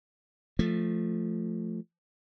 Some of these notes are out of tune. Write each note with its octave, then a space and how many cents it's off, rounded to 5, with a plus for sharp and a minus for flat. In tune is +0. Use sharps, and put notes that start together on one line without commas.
F3 +0 A3 +0